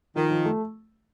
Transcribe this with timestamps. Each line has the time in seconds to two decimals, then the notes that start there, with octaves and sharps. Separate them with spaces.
0.15 D#3 F3
0.31 F3
0.45 A3